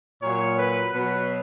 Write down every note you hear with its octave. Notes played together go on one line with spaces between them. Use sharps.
A#2 F#3 C#5
B4
B2 F#3 B4